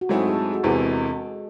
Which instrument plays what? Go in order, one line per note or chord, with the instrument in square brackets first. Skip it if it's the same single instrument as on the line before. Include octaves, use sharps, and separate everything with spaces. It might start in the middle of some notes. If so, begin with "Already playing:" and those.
[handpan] F#4
[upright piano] G#2 F#3 A3 C4 E4 [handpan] G#3 G#4
[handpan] A4
G#3 G#4
F#4
[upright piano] E1 E2 C3 E3 [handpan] G#3 G#4